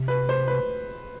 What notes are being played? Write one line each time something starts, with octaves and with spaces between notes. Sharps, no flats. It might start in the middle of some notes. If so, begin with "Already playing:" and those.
Already playing: C3
B4
C5
B4